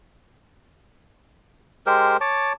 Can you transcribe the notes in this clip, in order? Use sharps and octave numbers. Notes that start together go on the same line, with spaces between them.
G#3 G4 A#4 C5
C#5 A5 D6